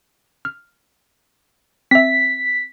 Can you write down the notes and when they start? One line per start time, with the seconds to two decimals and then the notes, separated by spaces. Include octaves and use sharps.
0.45 F6
1.91 C4 E5 B6